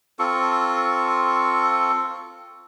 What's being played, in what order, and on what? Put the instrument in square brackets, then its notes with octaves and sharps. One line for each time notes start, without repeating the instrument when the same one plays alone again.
[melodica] C4 F4 A4 C#6